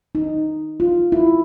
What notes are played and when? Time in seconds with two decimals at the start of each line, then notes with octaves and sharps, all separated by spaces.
0.15 D#4
0.80 F4
1.12 E4